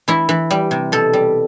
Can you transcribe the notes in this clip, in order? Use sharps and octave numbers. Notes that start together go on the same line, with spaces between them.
E3 E4
E3
G3
C3
B2 A4
G3